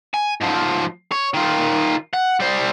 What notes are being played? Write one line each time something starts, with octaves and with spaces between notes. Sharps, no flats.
G#5
G#2 F3
C#5
D#3 F4
F#5
G3 C5